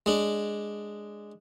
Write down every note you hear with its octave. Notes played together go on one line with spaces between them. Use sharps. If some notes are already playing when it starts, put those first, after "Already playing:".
G#3 D4